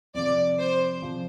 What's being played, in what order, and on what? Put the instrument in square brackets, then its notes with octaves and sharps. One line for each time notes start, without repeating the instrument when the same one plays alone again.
[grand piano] F2 C3 F3 [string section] D5
[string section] C5
[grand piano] C3 F3